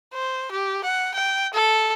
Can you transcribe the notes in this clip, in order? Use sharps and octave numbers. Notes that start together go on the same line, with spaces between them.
C5
G4
F#5
G5
A4